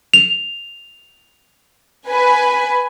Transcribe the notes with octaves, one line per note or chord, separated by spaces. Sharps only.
F7
B4 G#5